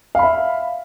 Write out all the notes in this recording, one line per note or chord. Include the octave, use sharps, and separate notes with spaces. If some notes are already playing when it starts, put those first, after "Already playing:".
E5 F5 B5